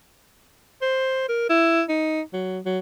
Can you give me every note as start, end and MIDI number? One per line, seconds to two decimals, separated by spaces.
0.82 1.25 72
1.29 1.48 70
1.49 1.82 64
1.89 2.21 63
2.33 2.59 54
2.65 2.79 54